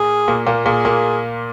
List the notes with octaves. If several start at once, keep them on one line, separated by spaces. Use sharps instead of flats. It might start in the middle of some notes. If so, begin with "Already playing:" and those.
Already playing: A#2 A#3 G#4
A#2 A#3
A#2 A#3
A#2 A#3 G#4
A#2 A#3